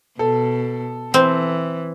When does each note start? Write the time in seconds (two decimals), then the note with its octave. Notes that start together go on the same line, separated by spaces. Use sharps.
0.19 B2 A4
1.14 E3 C4